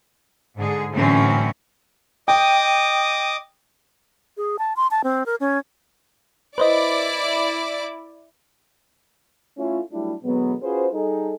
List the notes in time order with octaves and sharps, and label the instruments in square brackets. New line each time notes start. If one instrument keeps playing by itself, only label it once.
[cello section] G#2 D3 G#4
A2 D3 E3 F#3 C4 C#4
[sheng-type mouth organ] D#5 D6 D#6 [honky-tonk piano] G5
[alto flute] G#4
A5
C6
A5
C4
A#4
C#4
[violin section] E4 D5 D6 [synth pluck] B4 C5 D#5
[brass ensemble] A3 C#4 E4 F4
F#3 G3 A3 D4 E4
B2 D3 F#3 G#3 B3
C#4 F4 F#4 G#4 B4 C5
G3 D#4 G#4 A4